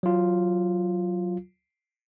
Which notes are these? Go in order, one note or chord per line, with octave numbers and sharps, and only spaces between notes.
F#3 F4